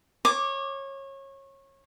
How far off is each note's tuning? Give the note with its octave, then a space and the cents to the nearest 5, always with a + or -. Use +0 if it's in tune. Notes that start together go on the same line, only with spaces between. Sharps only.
C#5 -25 D6 +0